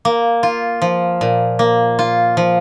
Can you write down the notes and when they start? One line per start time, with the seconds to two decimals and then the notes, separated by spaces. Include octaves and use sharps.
0.05 A#3
0.43 F4
0.82 F3
1.21 A#2
1.59 A#3
1.99 F4
2.37 F3